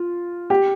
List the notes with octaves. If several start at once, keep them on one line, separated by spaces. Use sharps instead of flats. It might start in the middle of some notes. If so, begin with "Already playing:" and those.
Already playing: F4
G4